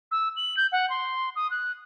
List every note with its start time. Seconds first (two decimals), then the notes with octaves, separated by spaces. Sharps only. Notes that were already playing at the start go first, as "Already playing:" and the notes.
0.11 E6
0.36 F#7
0.57 G6
0.72 F#5
0.90 C6
1.36 D#6
1.50 F#6